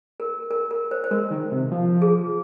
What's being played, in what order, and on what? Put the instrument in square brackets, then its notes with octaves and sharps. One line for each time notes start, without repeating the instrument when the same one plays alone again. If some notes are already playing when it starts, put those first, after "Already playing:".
[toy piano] A#4
A#4
A#4
C5
C5
[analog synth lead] G#3 [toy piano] A#4
[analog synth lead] D#3
C3
F3
[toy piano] G#4